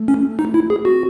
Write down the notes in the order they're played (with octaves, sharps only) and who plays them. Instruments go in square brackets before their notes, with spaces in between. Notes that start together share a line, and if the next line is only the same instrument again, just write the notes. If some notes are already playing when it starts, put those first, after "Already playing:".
Already playing: [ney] A3
[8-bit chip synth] C#4
D#4
E4
G#4
[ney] C4 [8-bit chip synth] F#4